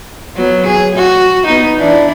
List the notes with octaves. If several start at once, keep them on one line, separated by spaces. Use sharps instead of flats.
F#3 B3
G#4
F#4
B3 D#4
E3 D4 E4